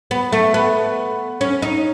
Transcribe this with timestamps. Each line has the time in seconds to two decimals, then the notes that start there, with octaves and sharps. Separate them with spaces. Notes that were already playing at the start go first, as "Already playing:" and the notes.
0.11 B3
0.33 A3
0.54 B3
1.41 C#4
1.62 D#4